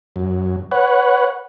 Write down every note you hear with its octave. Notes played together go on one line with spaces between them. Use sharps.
F#2
B4 C#5 F#5